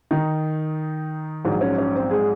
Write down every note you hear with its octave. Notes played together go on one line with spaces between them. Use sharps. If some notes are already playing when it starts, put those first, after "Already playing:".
D#3 D#4
A#1 G#2 F#3
C#4
C#4
C4
G#3 G#4